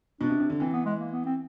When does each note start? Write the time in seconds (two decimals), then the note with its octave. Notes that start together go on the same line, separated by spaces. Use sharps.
0.21 B2 D4
0.30 C3
0.40 C3
0.50 D3
0.60 E3 C4
0.73 B3
0.86 G#3
1.00 A#3
1.12 B3
1.26 C4